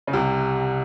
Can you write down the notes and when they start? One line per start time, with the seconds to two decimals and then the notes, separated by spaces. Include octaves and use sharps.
0.07 C#3
0.13 C2 C3